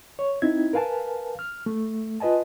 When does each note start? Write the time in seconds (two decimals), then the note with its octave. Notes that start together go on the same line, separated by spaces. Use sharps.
0.19 C#5
0.42 C4 D#4 E4 G#6
0.73 A#4 B4 F5 G#5 A5
1.39 F6
1.66 A3
2.20 F4 B4 D#5 G#5 A5